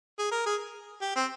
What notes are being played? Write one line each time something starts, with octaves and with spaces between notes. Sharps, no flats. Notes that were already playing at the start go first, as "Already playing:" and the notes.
G#4
A#4
G#4
G4
C4